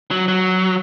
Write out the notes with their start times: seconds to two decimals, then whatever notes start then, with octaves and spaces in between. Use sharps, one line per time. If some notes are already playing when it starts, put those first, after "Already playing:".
0.11 F#3
0.28 F#3